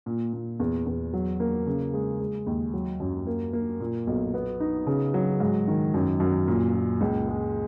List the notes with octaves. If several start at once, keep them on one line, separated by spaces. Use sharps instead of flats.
A#2
A#2
E2
E2
F#3
A#3
C#3
G#3
G#3
D#2
F#3
F#2
A#3
A#3
A#2
B1
B3
D#4
C#3
F#3
G#2
D#3
F#2
F#2
A#2
A#2
C#2
G#3